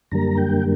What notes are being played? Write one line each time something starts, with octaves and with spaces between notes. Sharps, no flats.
F#2 D3 G3 A#3 A#5
G5